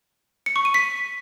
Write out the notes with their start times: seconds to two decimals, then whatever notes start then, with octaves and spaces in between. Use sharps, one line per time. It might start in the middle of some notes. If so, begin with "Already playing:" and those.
0.46 C#7
0.56 C#6
0.65 D#7
0.74 B6